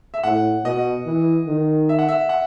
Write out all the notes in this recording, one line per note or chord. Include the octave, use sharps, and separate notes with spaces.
E5
A2 F#5
B2 D#5
E3
D#3
E5
F#5
E5
F#5